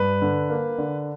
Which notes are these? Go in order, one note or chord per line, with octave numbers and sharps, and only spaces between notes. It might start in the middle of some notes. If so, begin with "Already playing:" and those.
Already playing: G2 B4
D3
A#3
D3